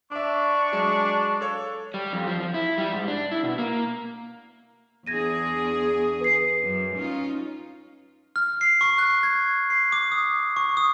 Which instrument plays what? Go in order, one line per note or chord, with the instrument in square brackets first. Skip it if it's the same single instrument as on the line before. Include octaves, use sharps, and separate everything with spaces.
[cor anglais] D4 [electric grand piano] E5 D6 [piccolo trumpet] C#6
[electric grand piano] F#3 G#3
A4 C#5 F5
[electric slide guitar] G3
F2
F3
F3
E4
G3
G#2
D4
E4
B2
A#3
[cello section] E2 D4 G#4 [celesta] G#6 A#6 D#7
[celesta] B4 C7
[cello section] F#2
C#4 D#4 F4
[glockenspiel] F6
C7
C#6
F#6
G#6
C7
D6
D#6
C#6
D#6